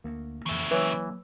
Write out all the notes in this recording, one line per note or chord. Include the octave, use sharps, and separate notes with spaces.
D2 A#3
F2 C#3 E3 E4
E3 F#3 A#3 B4 C#5 E6